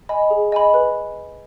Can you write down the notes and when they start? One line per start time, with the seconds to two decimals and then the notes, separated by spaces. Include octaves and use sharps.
0.09 D#5 G#5 B5
0.30 G#4
0.52 D#5 G#5 B5
0.74 B4